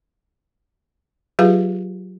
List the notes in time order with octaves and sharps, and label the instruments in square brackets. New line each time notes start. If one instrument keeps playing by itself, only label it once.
[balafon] F#3 F4 G4 G#4 B4 F5